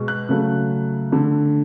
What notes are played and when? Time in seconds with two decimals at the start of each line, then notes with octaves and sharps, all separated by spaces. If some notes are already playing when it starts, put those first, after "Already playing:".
Already playing: B2 G#3
0.08 F#6
0.29 C#3 F#3 A3
1.12 D3 A3